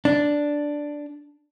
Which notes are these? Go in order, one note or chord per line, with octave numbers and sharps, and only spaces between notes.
D4